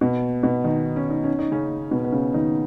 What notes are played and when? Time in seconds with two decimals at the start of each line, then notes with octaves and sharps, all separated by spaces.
0.01 B2 B3
0.43 B2 B3
0.64 D#3 D#4
0.96 C#4
1.10 D#4
1.24 C#4
1.39 D#4
1.52 C#3 C#4
1.91 B2 B3
2.05 B3
2.12 C#3 C#4
2.34 D#3 D#4